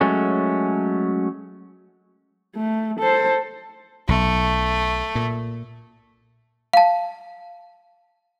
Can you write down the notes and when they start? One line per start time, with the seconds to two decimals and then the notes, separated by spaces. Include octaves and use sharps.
0.01 F#3 G#3 A3 C#4
2.56 A3
2.99 A4 C5
4.09 B1 A3
5.15 A#2
6.73 F5 A5